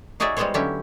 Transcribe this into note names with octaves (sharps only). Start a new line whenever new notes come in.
D#4 F#4 G#4 C#5 D5 E5
G3 G#3 B3 F#4 C5 C#5
D3 F#3 C#4 E4 G4